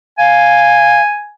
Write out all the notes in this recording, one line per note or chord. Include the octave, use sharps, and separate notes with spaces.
F5 G#5